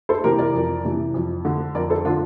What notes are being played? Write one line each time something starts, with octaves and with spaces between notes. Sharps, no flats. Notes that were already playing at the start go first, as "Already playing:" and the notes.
A4 C5
C3 E3 G4 A#4
A#4 D5
F2
C3 E3
F2
D3
F2 A#4 D5
A4 C5
D3 D4 F4